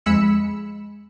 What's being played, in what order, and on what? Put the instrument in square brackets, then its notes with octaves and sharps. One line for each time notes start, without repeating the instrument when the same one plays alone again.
[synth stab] F2 G#3 B5 E6 C#7 E7